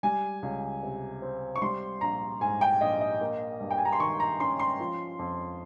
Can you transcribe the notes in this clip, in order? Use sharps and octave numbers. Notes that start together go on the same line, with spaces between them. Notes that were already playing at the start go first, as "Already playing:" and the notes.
G3 G#5
C#2
C3
C4
C#6
G3 C6
A#1 A#5
G#2 G#5
G5
A#1 D#5
D#5
A#3
G2
G5
G#5
A#5
C6
D#3 C#6
A#5
C#4 C6
C6
F3
F2